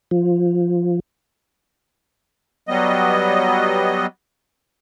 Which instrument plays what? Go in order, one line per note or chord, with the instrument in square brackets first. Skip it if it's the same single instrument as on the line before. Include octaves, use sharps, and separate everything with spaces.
[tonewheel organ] F3
[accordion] F#3 G3 B3 D#5